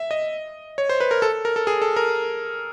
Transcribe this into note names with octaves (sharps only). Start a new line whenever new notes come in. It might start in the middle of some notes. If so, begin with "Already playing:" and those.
Already playing: E5
D#5
C#5
C5
B4
A#4
A4
A#4
A4
G#4
A4
A#4